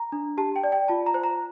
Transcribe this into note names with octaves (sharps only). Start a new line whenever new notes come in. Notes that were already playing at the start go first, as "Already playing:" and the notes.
Already playing: A#5
D4
G4 A5
G5
D5
G5
F4 A5
A#5
C5
A#5